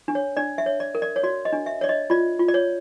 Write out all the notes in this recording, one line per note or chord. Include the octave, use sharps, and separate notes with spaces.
D4
C#5
D4 D5
E5
C#5
D5
A#4
D5
C#5
F#4 D5
D#5
D4
E5
C#5 D5
D#5
F4 D5
F4
D5
C#5